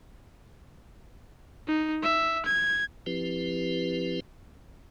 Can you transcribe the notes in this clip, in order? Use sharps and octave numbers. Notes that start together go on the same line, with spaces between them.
D#4
E5
G#6
F3 C4 E4 G4 B4